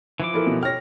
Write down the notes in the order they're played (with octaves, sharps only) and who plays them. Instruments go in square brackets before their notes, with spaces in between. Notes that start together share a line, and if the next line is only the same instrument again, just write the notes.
[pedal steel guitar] E3 F3 D6
[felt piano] E4 A4 A#4
[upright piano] B2
[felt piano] C#5 G5 [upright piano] F6 A#6